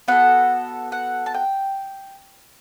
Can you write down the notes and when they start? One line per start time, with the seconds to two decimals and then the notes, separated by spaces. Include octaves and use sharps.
0.08 B3 F#4 A4 F#5
0.92 F#5
1.26 A5
1.34 G5